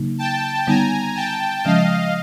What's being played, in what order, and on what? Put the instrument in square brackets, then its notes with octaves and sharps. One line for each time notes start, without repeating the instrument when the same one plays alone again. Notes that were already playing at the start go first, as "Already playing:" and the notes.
Already playing: [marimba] C#3 F#3 A#3 D#4
[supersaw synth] G5 A5
[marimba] D3 G3 B3 D#4 [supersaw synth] G#5 A#5
[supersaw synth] G5 A5
[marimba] C#3 F3 G#3 C#4 [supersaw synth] D#5 F5